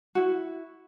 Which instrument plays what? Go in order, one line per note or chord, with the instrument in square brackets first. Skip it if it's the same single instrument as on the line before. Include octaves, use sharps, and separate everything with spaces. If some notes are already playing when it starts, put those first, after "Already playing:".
[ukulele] E4 F#4